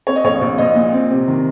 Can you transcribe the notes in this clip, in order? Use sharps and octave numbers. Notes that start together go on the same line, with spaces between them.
C4 C#5
D#5
A#1 C#5
A#1
A#1 D#5
A#2
C4
C3
D#3